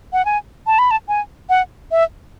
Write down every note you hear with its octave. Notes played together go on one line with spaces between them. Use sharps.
F#5
G#5
A5
B5
A5
G#5
F#5
E5